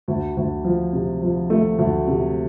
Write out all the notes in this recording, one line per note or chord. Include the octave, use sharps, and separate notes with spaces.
D2
D2
F3
C3
F3
A3
D2
C3